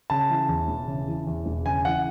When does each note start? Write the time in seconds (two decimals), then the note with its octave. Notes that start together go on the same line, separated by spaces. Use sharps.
0.10 C#3 A5
0.30 E3
0.49 E2
0.68 E1
0.88 C#3
1.08 E3
1.27 E2
1.46 E1
1.66 C#3 G#5
1.85 E3 F#5